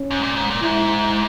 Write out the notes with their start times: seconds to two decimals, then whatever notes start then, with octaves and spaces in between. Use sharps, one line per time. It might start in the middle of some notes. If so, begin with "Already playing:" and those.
Already playing: C#4
0.11 G#2
0.23 A#2
0.36 G#2
0.51 A#2
0.62 G#2 E4